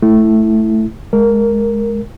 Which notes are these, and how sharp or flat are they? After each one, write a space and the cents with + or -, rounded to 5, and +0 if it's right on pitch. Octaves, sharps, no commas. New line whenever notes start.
A3 +0 E4 +0
G#3 +15 A#4 +0